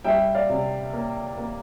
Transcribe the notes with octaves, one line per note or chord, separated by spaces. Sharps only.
G3 E5 G5
D5 F5
C3
A#3
A#3